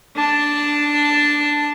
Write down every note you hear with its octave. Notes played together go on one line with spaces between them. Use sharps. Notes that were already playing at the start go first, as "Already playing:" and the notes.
D4 A5